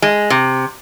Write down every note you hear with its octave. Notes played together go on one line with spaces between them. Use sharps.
G#3
C3